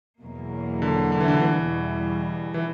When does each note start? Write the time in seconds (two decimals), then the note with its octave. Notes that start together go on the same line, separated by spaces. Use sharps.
0.22 E2 B2 F#3 A#3
0.82 D3
1.12 D3
1.20 E3
1.28 D3
1.41 E2 B2 E3 G3
2.54 E3